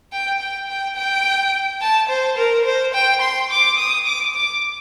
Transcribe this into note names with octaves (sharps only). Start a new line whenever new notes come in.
G5
G5
G5
G5
A5
C5
A#4
C5
G5
C6
D6
D#6
D6
D6